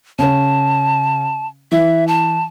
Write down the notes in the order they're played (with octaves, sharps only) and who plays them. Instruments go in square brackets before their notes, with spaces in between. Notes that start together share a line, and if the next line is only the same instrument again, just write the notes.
[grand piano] C#3 C#4 [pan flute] A5
[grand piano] E3 [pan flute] E5
[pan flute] A5